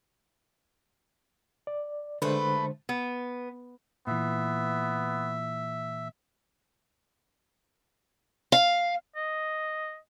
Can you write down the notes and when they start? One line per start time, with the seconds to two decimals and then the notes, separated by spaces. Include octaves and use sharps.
1.67 D5
2.22 D3 G#3 A3 B4 C5
2.89 B3
4.07 A#2 E3 B3 E5
8.52 F5
9.16 D#5